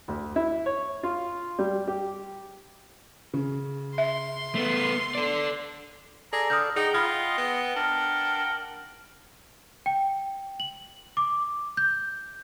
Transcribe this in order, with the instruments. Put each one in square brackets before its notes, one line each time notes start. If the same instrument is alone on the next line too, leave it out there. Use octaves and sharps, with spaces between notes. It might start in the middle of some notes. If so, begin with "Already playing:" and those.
[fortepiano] D2
E4
C#5
F4
G3
G4
[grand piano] C#3
[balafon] E5 [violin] C6
[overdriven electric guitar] A3 B3
A4 D5
[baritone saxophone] G#4 [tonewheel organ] A4 D5 [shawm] A#5
[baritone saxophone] D3 [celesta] D#6 F6 G6
[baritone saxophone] D#4 [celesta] G#4 [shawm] D#5 [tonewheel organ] F#5 G5
[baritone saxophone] F4 [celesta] B5 D#6 F6
[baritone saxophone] B3
[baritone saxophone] D4 [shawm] A#4
[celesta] G5
F#7
D6
G6